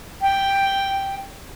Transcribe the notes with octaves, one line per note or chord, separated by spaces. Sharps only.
G5